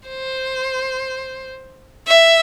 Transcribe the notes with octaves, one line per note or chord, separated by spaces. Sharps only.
C5
E5